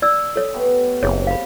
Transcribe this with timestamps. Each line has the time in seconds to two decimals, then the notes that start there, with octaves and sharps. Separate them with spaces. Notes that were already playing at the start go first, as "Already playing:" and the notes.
0.02 D5 E6
0.36 A4 C#5
0.54 A3 B3 G4
1.03 F#1 C3 G#4 C#5
1.27 F5 B5